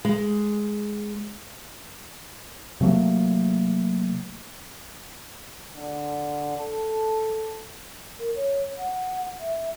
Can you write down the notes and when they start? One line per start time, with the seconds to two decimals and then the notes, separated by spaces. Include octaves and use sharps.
0.05 G#3
2.81 C3 F#3 A3 A#3
5.76 D3
6.57 A4
8.19 A#4
8.36 C#5
8.78 F#5
9.40 E5